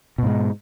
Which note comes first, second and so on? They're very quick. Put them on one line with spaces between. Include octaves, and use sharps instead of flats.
B2 G#2 G#3